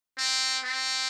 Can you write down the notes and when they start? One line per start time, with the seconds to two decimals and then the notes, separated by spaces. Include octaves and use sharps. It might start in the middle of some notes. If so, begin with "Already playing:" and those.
0.18 C4
0.64 C4